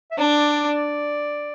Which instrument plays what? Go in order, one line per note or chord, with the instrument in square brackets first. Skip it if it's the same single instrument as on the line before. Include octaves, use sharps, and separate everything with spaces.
[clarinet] E5
[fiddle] D4 [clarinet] D5